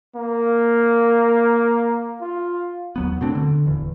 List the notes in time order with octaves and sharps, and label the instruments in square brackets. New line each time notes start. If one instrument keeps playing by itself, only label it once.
[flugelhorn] A#3
F4
[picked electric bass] D#2 F#3 B3
B2 A3 C4 D4
D3
D1 E2